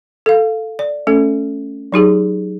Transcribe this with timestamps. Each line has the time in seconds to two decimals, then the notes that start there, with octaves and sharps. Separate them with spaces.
0.26 A4 F5
0.79 D5
1.07 A3 C#4 A4
1.92 F#3 D#4 G4 G#4